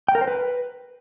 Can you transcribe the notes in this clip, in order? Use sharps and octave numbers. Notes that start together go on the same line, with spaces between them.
G5
A#4
C5
B4